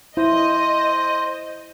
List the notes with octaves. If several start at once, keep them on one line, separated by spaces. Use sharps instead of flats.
E4 C5 D#5